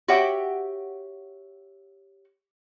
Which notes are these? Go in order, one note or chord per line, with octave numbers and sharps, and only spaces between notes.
F#4 G4 C#5 E5 F#5 G5